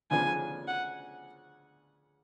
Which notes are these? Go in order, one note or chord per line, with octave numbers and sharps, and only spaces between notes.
D2 C#3 F3 B3 D4 G#5
F#5